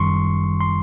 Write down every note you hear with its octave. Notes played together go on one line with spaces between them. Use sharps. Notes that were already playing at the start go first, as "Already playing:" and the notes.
Already playing: G1 F#2 D#3 G3 C6 C#6
C6